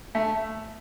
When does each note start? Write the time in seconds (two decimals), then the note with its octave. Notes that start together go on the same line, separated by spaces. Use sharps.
0.15 A3